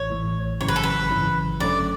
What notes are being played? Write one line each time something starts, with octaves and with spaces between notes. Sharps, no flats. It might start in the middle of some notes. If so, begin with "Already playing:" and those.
Already playing: A1 A2 E3 C#5
A1 A2 E3
G#1 F#2 C#3 E3 C#5
B4
A4
B4
G#1 F#2 C#3 E3
G#1 F#2 D3 A3 C#4 D5